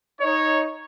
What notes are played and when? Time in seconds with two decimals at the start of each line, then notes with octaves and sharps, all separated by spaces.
0.21 D#4 C#5